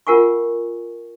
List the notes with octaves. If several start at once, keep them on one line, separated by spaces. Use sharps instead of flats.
F4 A#4 F#5 G#5 C#6